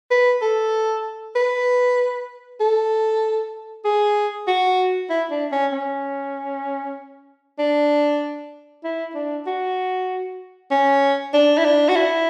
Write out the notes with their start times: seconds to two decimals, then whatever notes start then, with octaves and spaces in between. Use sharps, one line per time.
0.11 B4
0.42 A4
1.35 B4
2.60 A4
3.85 G#4
4.48 F#4
5.10 E4
5.31 D4
5.52 C#4
5.72 C#4
7.59 D4
8.84 E4
9.15 D4
9.47 F#4
10.71 C#4
11.33 D4
11.58 E4
11.65 D4
11.89 F#4
11.96 E4